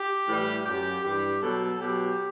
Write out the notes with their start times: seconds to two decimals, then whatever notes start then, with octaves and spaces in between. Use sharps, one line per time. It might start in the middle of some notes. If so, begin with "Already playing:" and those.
Already playing: G4
0.28 A2 E3 G3
0.66 F#2 F#3 G4
1.04 G2 E3 G3 G4
1.42 B2 F#3 A4
1.80 B2 F#3 G4